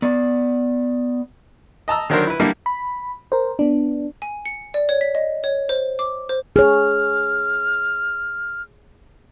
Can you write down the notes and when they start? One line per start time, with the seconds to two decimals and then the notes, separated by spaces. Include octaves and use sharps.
0.02 B3 D5
1.88 D#5 A5 A#5 E6
2.10 D3 D#3 F#3 D4 A#4 C5
2.27 E4 B4
2.40 D3 G3 A#3 D4 E4
2.66 B5
3.32 A#4 C5
3.59 B3 D4
4.22 G#5
4.45 C#7
4.74 D5
4.89 C#5
5.01 B6
5.15 D#5
5.44 C#5
5.69 C5
5.99 D6
6.29 C5
6.56 G#4 C#5 F6